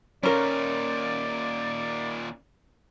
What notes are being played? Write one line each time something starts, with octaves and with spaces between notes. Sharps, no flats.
D#2 A#2 C#4 A#4 D5